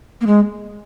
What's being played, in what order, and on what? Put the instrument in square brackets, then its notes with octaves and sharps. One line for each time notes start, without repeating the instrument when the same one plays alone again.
[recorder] A#3
G#3